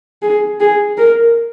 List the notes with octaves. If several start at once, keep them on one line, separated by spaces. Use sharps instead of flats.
G#4
G#4
A#4